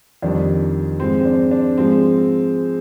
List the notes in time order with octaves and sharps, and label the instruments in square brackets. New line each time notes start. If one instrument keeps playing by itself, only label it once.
[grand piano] F2 D#3 G3 D4
G#2 F3 G#3 C4
C4
D4
D4
G#2 F3 G#3 C4